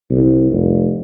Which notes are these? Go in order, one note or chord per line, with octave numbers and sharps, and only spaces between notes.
C2
F1